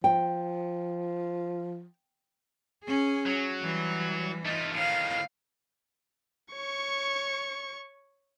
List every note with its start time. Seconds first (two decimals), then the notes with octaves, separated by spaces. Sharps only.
0.04 F3 G5
2.84 C#4 G#4
3.26 F#3
3.62 E3 G3
4.45 A3 D#4 F4
4.75 A2 D#3 F5
6.53 C#5 C#6